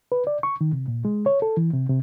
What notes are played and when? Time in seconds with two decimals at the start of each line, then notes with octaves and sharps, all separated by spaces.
0.12 B4
0.27 D5
0.43 C#6
0.61 D#3
0.73 C3
0.88 A#2
1.05 G#3
1.26 C#5
1.42 A4
1.57 E3
1.73 C3
1.89 C3